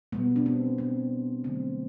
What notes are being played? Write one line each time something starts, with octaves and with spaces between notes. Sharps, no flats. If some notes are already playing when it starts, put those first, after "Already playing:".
B2 G3 B3
D4
C4
C4
D3 F#3 A3 C4